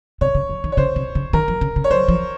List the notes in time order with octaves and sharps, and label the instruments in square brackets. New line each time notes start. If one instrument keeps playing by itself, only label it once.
[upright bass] C3 [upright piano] C#5
[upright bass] C#3
F3
D#3
[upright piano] C#5
[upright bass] C#3 [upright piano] C5
[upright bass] C3
C#3
[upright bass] D#3 [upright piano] A#4
[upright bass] F3
C#3
C#3
[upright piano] C#5
[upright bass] F#3 [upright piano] C5
[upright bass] F3